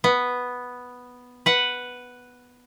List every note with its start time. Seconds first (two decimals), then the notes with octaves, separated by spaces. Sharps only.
0.04 B3
1.46 B4 F#5